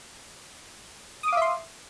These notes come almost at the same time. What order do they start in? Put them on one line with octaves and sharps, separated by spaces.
D#6 D6 F5 E5 C6